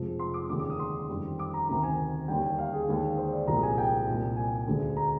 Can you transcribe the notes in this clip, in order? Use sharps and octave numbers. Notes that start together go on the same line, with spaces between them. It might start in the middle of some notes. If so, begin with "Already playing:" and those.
Already playing: F1 F2 C3 F3 G#3
C6
D6
F1 D#2 D3 G#3 D6
D6
D#6
C6
F2 D#3 G3
D6
A#5
D2 C3 D#3 A#5
G#5
D#2 D3 G3 G5
F5
G#4
D#2 D3 G#3
C5
D5
C2 A#2 F3 G#3 A#5
G#5
G5
C2 A#2 G3
G#5
D2 D3 G#3
A#5